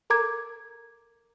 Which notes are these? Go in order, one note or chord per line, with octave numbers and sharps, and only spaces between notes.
A4 A#4 A#5 D6 G#6